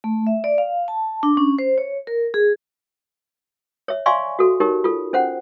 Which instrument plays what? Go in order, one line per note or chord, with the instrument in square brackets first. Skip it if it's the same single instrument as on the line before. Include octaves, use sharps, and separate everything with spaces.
[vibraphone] A3
E5
D5
F5
A5
D4
C#4
C5
C#5
A#4
G#4
[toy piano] C#5 E5
D5 E5 F5 G#5 C6 C#6
F#4 A4
D#4 G4 A#4 C#5
F4 A4
C#4 C5 F#5